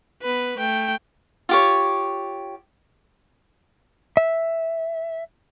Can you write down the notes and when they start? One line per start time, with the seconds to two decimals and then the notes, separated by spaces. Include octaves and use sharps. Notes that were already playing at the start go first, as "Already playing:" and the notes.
0.22 B3 B4
0.58 A3 G5
1.49 F4 G4 C#5
4.17 E5